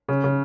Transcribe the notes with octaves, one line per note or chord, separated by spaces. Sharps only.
C#3
C#3